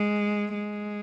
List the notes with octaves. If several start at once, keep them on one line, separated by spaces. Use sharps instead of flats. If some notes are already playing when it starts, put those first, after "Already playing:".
Already playing: G#3
G#3